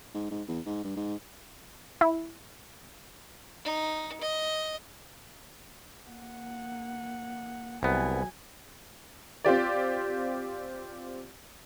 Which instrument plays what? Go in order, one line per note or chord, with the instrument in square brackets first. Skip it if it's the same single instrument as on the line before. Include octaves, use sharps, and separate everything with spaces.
[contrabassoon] G#2
G#2
E2
G#2
G2
G#2
[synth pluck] E4
[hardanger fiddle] D#4
D#5
[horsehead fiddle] A#3 F#5
[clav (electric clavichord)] C2 B3 [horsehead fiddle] F#3 G#5
[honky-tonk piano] C4 F4 G4 D5